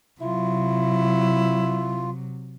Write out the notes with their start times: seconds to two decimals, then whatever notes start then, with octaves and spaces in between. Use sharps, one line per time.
0.21 C3 F#3 E4 F4